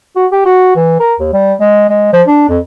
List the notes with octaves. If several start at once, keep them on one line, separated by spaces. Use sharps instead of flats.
F#4
G4
F#4
E3
A#4
D#2
G3
G#3
G#3
F3
D4
F2